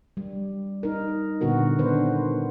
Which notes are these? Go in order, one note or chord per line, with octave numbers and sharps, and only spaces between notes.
G3
D#4 A#4
A#2 D3 B3 F#4 A#4
D#3 B3 D4 B4 C5